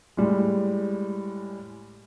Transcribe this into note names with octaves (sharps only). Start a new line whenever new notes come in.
A2 G3 G#3